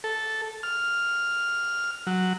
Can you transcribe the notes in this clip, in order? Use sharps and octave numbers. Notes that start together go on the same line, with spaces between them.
A4
F6
F#3